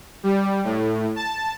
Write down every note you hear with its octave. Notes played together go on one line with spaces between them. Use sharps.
G3
A2
A5